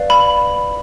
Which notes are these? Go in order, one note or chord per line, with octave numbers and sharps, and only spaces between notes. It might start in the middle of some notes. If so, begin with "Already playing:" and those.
Already playing: B4 D5 F5
B5